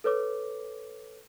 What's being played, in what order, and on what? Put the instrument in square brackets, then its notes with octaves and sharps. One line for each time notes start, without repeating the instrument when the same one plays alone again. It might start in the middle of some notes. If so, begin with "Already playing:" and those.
[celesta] A4 B4 C#5 D6